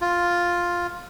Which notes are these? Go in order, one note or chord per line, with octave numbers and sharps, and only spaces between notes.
F4